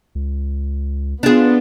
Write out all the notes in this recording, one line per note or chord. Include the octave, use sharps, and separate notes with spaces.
C#2
B3 D4 F4 G#4